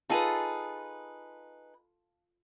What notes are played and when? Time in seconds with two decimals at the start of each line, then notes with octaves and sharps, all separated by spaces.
0.10 D#4 F4 G#4 A4 B4